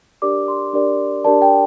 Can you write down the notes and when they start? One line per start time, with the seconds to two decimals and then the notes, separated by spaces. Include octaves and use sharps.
0.22 D4 G4 A#4 D5 D6
0.48 C6
0.73 D4 G4 A#4 D5
1.25 D4 G4 A#4 D5 A5
1.42 G5